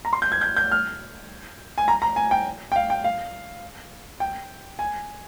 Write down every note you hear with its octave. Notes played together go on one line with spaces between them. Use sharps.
A#5
C6
G6
G#6
G6
G6
F6
G#5
A#5
A#5
G#5
G5
G5
F5
G5
F5
G5
G#5